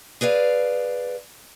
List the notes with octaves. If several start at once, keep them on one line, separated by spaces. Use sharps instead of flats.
G#4 B4 D5 F5